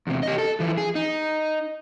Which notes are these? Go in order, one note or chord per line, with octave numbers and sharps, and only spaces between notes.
E2 C3
G4 D#5
A4
E3 F3
G#4
D#4